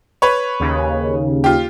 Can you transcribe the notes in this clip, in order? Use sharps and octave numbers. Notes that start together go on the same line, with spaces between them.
B4 C#5
D#2 C#3
F4 G4